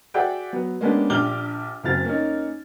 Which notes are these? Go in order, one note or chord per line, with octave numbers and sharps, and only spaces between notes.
F#4 G#4 D5 E5 F#5 G5
F#3 B3
G#3 A#3 B3 C#4 D4 G4
A#1 D4 G4 D6 F6 G7
F#1 F#3 C4 E4 F6 A6
A#3 C#4 D#4